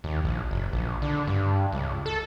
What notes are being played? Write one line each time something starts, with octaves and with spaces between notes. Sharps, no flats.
D#2
A#1
F#1
A#1
D3
G2
C#2
A4